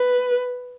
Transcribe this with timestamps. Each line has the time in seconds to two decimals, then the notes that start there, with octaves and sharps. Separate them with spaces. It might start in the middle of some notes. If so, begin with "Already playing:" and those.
Already playing: B4